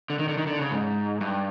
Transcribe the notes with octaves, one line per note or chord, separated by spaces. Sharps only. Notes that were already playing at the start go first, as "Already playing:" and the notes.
D3
D#3
D3
D#3
D3
C#3
G#2
G2